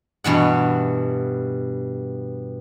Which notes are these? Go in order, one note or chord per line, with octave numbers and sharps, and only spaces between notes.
G2 B2 E3 F#5